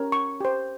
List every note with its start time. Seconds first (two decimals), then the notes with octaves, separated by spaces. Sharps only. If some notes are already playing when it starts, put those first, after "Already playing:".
Already playing: C#4 G4 A#4 C#5
0.12 C#6
0.40 G4 C5